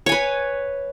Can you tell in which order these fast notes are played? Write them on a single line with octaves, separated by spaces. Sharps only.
C#5 G#5 B4